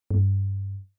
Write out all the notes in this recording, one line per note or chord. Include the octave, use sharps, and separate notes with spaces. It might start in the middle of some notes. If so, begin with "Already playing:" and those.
G2